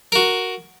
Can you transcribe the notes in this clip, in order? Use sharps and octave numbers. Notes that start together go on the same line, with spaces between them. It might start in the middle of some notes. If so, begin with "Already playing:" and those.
F#4 A#4